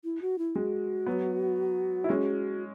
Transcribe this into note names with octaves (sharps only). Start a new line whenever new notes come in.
E4
F#4
E4
G#3 F#4
F#3 B3
E4
G#3 C#4